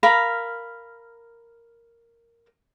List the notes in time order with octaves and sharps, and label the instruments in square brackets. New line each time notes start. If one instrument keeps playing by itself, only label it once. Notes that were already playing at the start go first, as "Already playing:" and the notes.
[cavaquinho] A#4 F5 B5